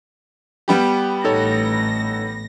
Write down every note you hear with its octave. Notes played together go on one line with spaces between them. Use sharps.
G3 B3 G4
A1 D#4 A4 C#5 A#6